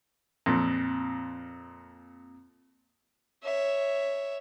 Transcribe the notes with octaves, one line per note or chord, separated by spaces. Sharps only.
F2 A#2
C#5 E5